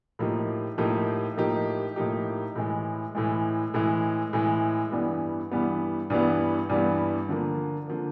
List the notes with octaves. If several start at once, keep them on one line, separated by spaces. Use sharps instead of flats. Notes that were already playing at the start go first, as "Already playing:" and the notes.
A2 F3 A#3 D#4 G4
A2 F3 A#3 D#4 G4
A2 F3 A#3 D#4 G4
A2 F3 A#3 D#4 G4
A2 E3 G#3
A2 E3 G#3
A2 E3 G#3
A2 E3 G#3
G2 E3 G3 B3
G2 E3 G3 B3
G2 E3 G3 B3
G2 E3 G3 B3
D3 F3 A#3
D3 F3 A#3